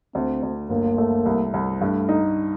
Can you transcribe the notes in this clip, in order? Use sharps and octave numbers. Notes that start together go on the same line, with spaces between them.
D2 C4
D2
G1 A#3
A3
C2
C2
G2 A3
D#4